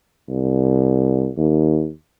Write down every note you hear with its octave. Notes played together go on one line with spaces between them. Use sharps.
C2
D#2